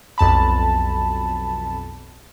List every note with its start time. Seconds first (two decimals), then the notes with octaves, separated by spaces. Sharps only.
0.18 B1 F2 A5 B5